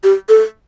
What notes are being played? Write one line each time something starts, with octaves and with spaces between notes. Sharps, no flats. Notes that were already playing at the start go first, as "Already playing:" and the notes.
G4
A4